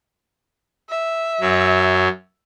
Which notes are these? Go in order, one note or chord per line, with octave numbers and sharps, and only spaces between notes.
E5
F#2 F#3